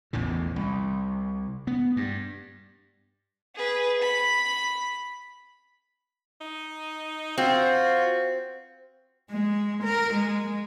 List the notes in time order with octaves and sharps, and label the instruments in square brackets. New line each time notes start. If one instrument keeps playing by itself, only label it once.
[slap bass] A1 E2 A2 C#3
C2
B3
G2
[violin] G#4 B4
B5
[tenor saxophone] D#4
[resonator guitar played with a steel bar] C4 [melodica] F4 [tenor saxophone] F#4
[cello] G#3
A#4
G#3